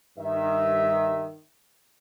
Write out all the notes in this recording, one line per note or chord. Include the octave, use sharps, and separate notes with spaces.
G2 D#3 E5